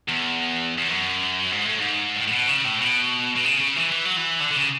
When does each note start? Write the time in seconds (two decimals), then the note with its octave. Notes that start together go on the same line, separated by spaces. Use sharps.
0.09 E2
0.78 E2
0.88 F#2
1.52 G#2
1.65 A2
1.80 G#2
2.16 A2
2.27 A2
2.32 B2
2.48 C#3
2.65 A2
2.81 B2
3.35 B2
3.44 C#3
3.59 C#3
3.76 E3
3.92 E3
4.05 F#3
4.17 E3
4.41 D3
4.51 D3
4.57 C#3